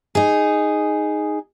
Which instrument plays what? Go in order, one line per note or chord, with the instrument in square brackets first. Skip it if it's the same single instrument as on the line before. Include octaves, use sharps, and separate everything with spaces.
[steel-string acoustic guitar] D#4 G#4